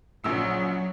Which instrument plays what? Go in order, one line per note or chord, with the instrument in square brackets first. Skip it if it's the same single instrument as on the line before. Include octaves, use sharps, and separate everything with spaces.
[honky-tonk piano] A#1 C#3 E6 [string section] F#3